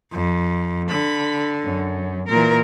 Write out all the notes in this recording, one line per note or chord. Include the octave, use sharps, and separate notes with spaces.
F2
D3 B5
F#2
A#2 E3 A#4